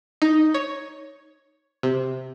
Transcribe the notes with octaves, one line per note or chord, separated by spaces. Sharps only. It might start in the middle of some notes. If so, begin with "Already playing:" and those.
D#4
C#5
C3